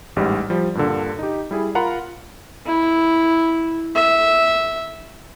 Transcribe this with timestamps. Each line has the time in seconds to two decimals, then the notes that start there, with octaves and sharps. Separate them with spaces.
0.16 A1 G#2 G3
0.50 F3 G3
0.75 G2 A#2 D3
1.19 D#4 G4
1.51 G3 E4 G#4
1.75 F4 A#4 F5 F#5 A#5 B5
2.66 E4
3.95 E5